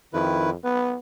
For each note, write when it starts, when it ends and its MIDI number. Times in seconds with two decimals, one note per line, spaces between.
0.13 0.56 41
0.13 0.50 51
0.13 0.50 64
0.13 0.50 71
0.64 0.97 59
0.64 0.89 71